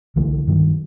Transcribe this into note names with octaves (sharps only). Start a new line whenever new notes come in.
C2 D3 E3 A3
G2 D#3 F#3